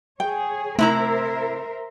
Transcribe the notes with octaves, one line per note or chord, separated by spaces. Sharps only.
G#4 C#5 G5
C3 A3 E4 A#4 C5 E5 A#5